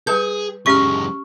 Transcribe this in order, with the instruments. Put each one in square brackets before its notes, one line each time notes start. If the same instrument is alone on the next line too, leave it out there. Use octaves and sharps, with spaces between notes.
[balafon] G3 B4 [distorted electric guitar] G#4 A4 [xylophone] G6
[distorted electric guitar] F#2 G#3 [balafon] C#4 G4 [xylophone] C#6 F6